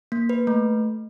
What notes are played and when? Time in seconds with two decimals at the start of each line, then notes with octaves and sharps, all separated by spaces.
0.12 A#3
0.30 B4
0.47 A3